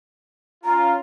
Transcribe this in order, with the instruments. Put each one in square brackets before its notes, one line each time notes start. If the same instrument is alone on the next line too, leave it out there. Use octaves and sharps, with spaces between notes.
[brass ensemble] C#4 F4 [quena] A#5